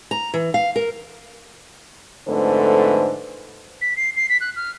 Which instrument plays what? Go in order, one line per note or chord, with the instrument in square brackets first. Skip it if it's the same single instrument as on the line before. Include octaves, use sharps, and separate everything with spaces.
[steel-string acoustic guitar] A#5
E3
F5
A#4
[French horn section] F2 G#2 D3 A3 B4 C5
[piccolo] B6
C7
C7
B6
F#6
F6